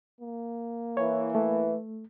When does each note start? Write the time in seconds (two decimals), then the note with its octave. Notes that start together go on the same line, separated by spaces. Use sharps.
0.21 A#3
0.97 E3 C#5
1.35 A3